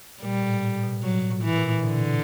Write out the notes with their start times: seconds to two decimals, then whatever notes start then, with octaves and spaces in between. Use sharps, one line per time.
0.22 A#2 G3
0.42 A2
0.62 A#2
0.83 B2
1.03 A2 F#3
1.30 A2
1.43 E3
1.57 A#2
1.84 B2 D3